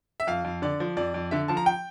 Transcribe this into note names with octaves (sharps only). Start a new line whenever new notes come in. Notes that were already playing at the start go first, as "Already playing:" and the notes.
E5
F2 F5
F2
D3 D5
F3
F2 D5
F2
D3 E5
F3 A5
A#5
G5